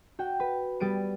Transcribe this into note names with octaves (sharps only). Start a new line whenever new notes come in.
F#4 G5
B4
G3 B3 A6 D7 D#7